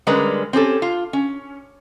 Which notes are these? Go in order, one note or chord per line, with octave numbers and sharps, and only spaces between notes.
D3 G3 G#3 C#4 A#4 B4
C4 C#4 G4 A4
F4
C#4